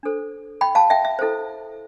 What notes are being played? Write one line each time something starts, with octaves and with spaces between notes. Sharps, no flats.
D4 A4 C5
G5 B5
F5 A5
E5 G5
E5
E4 A4 C5